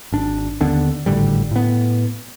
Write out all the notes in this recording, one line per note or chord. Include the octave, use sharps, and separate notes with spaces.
G#1 D4
D#2 D3 B3 D4
G#1 A2 D3 G3
A2 B3